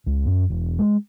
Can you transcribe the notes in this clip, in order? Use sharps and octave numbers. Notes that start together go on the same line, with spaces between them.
C#2
F#2
E1
G#3